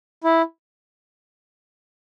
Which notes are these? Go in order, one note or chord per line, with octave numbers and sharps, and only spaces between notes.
E4